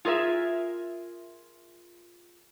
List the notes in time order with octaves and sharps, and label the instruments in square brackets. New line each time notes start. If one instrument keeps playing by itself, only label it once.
[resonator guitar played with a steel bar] F4 G#4 A#4 D#5 E5